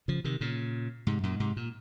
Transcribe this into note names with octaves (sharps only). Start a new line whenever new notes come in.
C#3 F3
C3 D#3
A#2 C#3
G#2 C3
F#2 A#2
G#2 C3
A#2